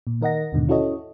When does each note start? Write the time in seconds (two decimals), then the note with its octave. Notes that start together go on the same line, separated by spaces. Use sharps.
0.07 A#2
0.21 D#3 A#4 D#5 F#5 A#6
0.52 D#2 G#2 B2 D3 D#3
0.68 C#4 E4 F#4 A4 C#5 D#5